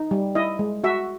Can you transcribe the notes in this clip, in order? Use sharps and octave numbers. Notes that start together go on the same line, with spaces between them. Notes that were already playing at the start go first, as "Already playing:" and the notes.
Already playing: D#4
G3
E4 D#5
G#3
F#4 E5